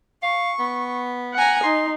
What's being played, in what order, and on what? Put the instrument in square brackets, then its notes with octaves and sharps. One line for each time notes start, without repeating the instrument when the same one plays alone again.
[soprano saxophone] F5 [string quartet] C#6
[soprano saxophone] B3
[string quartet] F#5 G#5 A#5
[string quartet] D#4 [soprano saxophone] C6